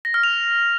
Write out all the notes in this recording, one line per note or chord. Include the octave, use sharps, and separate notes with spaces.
A#6
F6
F7